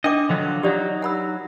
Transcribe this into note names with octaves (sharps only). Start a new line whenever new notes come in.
D4 D#5 G5 D6
D3 F3 F#3
F#3 D#4 G4 D5
F#5 B5 E6